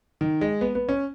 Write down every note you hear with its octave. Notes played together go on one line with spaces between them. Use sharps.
D#3
G#3
B3
B3
C#4